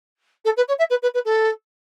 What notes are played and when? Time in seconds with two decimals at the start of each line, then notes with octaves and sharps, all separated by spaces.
0.45 A4
0.56 B4
0.68 C#5
0.78 E5
0.90 B4
1.02 B4
1.14 B4
1.25 A4